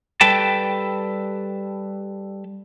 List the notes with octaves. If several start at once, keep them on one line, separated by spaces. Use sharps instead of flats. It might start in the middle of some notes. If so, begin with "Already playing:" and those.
G3 A4 B4 G5 A5